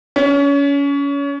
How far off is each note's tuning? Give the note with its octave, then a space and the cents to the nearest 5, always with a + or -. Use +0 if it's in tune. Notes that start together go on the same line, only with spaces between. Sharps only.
C#4 +30